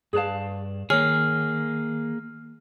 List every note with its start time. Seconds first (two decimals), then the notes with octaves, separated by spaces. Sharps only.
0.13 G2 G#4 B4 D5 F5 A5
0.90 D#3 A#3 G#4 C#5 F6